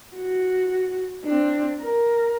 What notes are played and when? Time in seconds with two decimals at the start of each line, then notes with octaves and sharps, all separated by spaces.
0.17 F#4
1.25 C4 D4
1.81 A#4